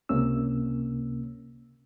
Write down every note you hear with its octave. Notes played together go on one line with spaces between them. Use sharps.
C#2 C3 A#3 C#4 E6